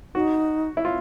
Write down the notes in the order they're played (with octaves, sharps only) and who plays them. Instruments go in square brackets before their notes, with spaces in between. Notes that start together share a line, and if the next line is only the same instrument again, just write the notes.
[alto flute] D#4 [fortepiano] F#4
[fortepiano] E4
F4